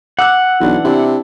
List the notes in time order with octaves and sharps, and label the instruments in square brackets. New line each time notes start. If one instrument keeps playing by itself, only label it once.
[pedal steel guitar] F#5 [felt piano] D6 E6 F#6
[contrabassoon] B1 [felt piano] E3 D4
[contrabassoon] C3 [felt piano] D4 E4